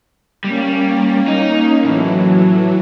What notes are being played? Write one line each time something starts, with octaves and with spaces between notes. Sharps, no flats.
G3 A#3 C#4
D#4
A2 E3 F#3